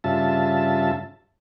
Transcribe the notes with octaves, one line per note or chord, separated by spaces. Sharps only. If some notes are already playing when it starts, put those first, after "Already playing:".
G2 C#3 F4 E5 A5